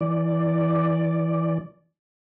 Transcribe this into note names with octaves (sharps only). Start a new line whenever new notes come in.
E3 D5